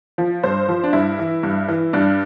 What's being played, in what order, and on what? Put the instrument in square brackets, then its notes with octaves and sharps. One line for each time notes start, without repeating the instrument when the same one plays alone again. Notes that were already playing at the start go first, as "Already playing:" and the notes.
[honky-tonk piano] F3
G2 C5
F3
D4
G2 E4
E3
G2
E3
G2 D4